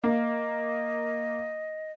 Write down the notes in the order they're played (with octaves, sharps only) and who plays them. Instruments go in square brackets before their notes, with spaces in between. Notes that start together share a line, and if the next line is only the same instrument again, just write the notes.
[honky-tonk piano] A#3 [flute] D#5